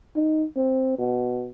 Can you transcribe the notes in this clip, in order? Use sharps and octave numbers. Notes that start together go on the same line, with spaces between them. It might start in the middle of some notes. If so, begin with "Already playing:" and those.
D#4
C4
B2